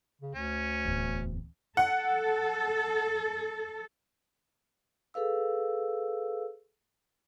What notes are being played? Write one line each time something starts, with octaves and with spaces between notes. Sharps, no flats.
C#3
D2 C#4
D1 E2
A4 F#5
G#4 A4 B4 F5 E6